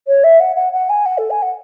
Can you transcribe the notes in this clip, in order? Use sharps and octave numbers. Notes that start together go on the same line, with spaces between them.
C#5
E5
F#5
F#5
F#5
G#5
F#5
A4
G#5
F#5